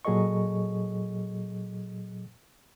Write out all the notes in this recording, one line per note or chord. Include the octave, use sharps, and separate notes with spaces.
A#2 F#3 G#4 A4 D#5 C#6